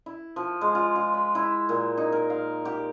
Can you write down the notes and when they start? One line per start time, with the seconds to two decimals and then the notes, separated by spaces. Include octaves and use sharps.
0.06 E4
0.36 F3
0.61 G#3
0.75 F4
0.96 F4
1.14 B5
1.35 E4
1.69 A#2
1.97 D#4
2.12 A#4
2.30 F5
2.65 G4